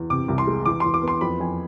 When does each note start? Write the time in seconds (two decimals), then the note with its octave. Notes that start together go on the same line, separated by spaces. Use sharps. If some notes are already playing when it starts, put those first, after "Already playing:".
Already playing: E2
0.10 C3 D6
0.28 C2
0.38 C6
0.47 G#3
0.65 E2 D6
0.80 E2 C6
0.94 D6
1.03 B3 C6
1.21 F2 B5
1.40 F2 G#5